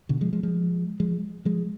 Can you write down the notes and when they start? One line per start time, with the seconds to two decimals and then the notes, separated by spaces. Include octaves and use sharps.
0.09 B2 D3
0.21 F3 G#3
0.33 F3 G#3
0.43 F3 G#3
1.00 F3 G#3
1.45 F3 G#3